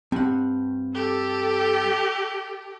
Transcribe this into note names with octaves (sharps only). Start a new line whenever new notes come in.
G2 C4 F#5
G4 A4